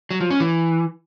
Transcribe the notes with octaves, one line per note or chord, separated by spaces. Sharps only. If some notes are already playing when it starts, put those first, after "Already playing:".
F#3
F3
C#4
E3